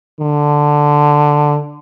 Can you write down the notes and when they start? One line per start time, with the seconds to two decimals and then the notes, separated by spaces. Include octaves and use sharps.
0.20 D3